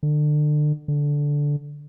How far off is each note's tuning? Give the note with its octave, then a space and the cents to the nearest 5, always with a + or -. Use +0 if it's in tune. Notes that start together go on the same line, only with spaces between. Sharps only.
D3 +30
D3 -10